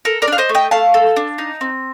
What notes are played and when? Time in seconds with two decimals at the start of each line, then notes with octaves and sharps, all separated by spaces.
0.05 A4 A#4
0.22 A#4 D5
0.28 D4 F5
0.38 C5 D#5
0.49 A3
0.55 D#5 G5
0.71 A3 F5 A5
0.94 A4
1.16 D4
1.38 D#4
1.61 C4